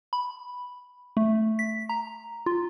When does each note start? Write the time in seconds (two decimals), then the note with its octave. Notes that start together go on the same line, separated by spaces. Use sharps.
0.13 B5
1.17 A3
1.59 B6
1.89 A#5
2.46 F4